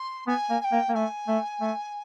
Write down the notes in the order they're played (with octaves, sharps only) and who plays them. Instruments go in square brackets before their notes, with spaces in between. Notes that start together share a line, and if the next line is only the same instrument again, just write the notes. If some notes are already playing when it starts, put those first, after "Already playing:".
Already playing: [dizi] C6
[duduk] B3 [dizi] G#5
[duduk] A#3
[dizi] G#5
G5
[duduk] A#3
A#3
[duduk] A3 [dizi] G#5
[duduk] A3
A3